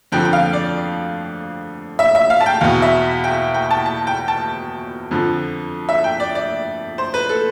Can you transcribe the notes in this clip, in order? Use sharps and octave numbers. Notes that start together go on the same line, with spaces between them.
F2 D3 F3 G5
G5
F5
D5
E5
E5
F5
A5
G5
E2 B2 F5
E5
G5
G5
A5
A5
G5
A5
F2 D3 F3
E5
G5
D5
D5
C5
B4
A4